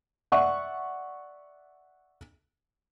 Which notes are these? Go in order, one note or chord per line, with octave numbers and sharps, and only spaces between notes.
D5 E5 F#5 C#6